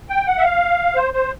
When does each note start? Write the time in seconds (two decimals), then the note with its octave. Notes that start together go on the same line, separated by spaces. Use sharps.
0.09 G5
0.27 F#5
0.38 E5
0.44 F5
0.95 C5
1.13 C5